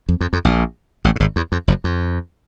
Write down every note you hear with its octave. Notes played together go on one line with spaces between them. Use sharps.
F2
F2
F2
A#1 A#2
A1 A2
A2
G#1 G#2
E2
F2
F#1 F#2
F2